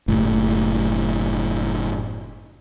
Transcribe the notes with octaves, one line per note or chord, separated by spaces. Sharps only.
F#1 A2